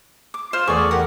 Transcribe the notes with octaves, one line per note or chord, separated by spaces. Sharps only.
D6
F4 C5 F6
E2 A3 G#4 D5 C#6
G4 A#4 F#5